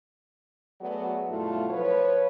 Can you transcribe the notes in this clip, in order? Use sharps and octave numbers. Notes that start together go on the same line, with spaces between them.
F#3 A3 B3 F#4 G#4 D5
G2 B2 F#3 A3 E4 F4
F3 B4 C#5